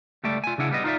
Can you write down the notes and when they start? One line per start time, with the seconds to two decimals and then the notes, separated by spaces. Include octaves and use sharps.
0.24 C#2 G3 A3 A4 D5
0.44 F4 G#5
0.58 C#3 D4 E4 F#5
0.71 G3 B3 D#5
0.84 D#4 F4 B4 C5 D5 E5